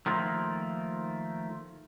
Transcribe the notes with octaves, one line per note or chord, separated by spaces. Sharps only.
D#3 F3 A3 A#3